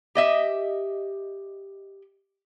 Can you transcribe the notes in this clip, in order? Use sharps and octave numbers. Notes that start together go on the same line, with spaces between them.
G4 D#5 E5